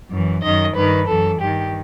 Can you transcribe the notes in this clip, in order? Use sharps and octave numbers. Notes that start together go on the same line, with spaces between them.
F#2 E3
F#2 D#3 D#5
G2 D#3 B4
F#2 E3 A4
G2 D#3 G4